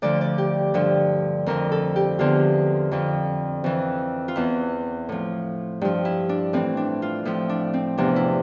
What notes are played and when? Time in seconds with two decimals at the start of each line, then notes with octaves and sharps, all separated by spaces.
0.02 D2 D3 F3 D5
0.21 D5
0.38 G4
0.74 G2 D3 F3
1.46 F2 D3 F3 A#4
1.72 A4
1.96 G4
2.19 E2 D3 F3 F4
2.91 F2 D3 F3
3.64 F2 E3
4.28 F4
4.36 E2 E3 E4
5.09 A2 F3
5.81 G2 F3
6.05 E4
6.29 D4
6.53 A2 E3 C4
6.77 D4
7.02 F4
7.25 A2 F3 E4
7.49 D4
7.74 C4
7.98 E2 C3 F3 D4
8.16 E4